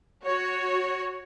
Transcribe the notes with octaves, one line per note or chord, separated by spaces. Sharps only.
F#4 C#5